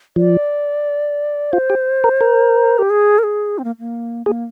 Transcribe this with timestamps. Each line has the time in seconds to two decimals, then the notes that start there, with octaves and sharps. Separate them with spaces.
0.16 F3 D5
1.52 F4 C5
1.70 G4
2.04 A#4
2.21 A#4
2.78 G4
2.90 G#4
3.19 A#4
3.23 G#4
3.58 C4
3.64 A#3
3.80 A#3
4.26 A#3 G#4